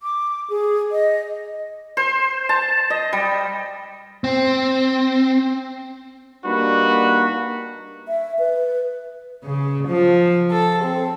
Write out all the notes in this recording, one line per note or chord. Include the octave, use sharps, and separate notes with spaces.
D6
G#4
D#5
C5
A5
D#5
G3
C4
G3 A#3 D4 D#4 F#4 B4
E5
B4
C#3
F3
A4
C4